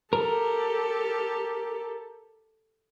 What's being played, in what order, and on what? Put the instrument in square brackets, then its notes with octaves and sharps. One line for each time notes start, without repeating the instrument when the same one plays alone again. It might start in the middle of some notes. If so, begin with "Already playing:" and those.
[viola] G4 A4 [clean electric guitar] A#4